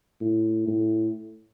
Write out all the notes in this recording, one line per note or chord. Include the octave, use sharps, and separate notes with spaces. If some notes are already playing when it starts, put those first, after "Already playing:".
A2
A2